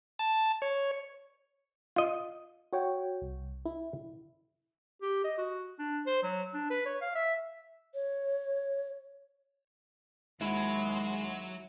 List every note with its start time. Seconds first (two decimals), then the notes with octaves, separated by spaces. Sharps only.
0.19 A5
0.62 C#5
1.96 F4 D#5
2.73 F#4 C#5 G5
3.22 C2
3.65 E4
5.02 G4
5.24 D#5
5.38 F#4
5.79 D4
6.06 C5
6.23 F#3
6.54 D4
6.70 B4
6.85 C#5
7.01 F5
7.15 E5
7.94 C#5
10.41 D#2 F#3 G#3 E4 F#5 C6